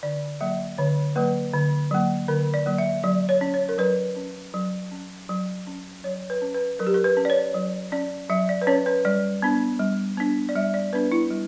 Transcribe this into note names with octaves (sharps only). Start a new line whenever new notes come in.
D3 D5
F#3 A#3 E5
D3 C#5
F#3 A#3 B4
D3
F#3 A#3
D3 A#4
D5
F#3 A#3
E5
F#3 D5
C#5
C#4
C#5
A#4
F#3 B4
C#4
F#3
C#4
F#3
C#4
F#3 C#5
B4
C#4
B4
F#3 A#4
G4
A#4
B4
C#4
D5
C#5
F#3
C#4 D5
F#3 E5
D5
B4
C#4 C#5
B4
G3 D5
B3 D4
G3
B3 D4
D5
G3 E5
D5
B3 D4 B4
E4
G3